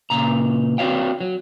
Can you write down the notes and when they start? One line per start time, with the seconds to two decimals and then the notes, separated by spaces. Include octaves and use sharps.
0.10 A#2 C#3 A#5
0.78 C4 D4 F#4 C#5 F5 G5
1.21 F#3